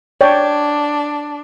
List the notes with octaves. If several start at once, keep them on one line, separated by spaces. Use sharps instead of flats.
D4 C#5 D5 G5